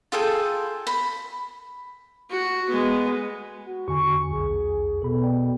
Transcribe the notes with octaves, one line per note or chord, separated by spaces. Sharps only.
F4 G#4 A4 G5
B5
F#4
G#3 B3
F#4
E2 D3 G#5 C#6
B1 E2 G#4
B2 A4 B5
D5 G5